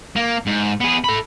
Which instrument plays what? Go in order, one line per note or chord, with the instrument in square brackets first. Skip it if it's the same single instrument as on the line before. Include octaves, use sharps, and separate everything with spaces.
[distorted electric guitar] A#3
G#2
B3 G#4
A4 B5